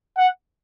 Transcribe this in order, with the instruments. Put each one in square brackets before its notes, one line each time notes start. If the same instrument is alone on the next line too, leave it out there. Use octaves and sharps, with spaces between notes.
[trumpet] F#5